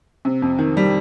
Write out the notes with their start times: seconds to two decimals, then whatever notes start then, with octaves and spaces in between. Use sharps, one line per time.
0.25 C3
0.42 F2
0.58 D#3
0.77 G3